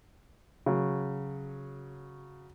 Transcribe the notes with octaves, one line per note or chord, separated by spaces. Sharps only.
C#3 F#3